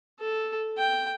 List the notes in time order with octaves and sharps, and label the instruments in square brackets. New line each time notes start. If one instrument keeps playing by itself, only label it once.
[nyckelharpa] A4
G5